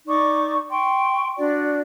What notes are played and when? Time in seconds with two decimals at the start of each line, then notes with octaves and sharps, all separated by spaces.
0.07 D#4 D5 C#6 D6
0.70 G5 C6 C#6
1.38 D4 F#4 D5